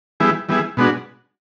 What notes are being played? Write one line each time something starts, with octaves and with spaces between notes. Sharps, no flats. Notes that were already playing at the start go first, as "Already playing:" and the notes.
E3 G3 B3 E4 G#4
E3 G3 B3 E4 G#4
B2 G#3 B3 D4 F#4